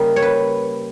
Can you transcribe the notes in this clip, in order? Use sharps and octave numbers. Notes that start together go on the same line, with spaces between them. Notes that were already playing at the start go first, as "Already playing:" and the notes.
Already playing: C#3 G3 A#3 D#5
C#5
B4